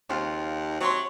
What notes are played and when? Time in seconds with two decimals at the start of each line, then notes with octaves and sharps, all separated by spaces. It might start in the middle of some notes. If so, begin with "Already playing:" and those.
0.09 D#2 C#3 C4 F4
0.80 C3 F#3 C#5 C6